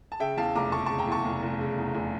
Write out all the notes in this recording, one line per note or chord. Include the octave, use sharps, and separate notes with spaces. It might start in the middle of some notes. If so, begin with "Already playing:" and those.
A5
C#3 E5 G5
E2 F5 A5
F1 A#5 D6
F1 A5 C#6
C#3 A5 C#6
G5 A#5
E2 A5 C#6
F1
F1
C#3
E2
F1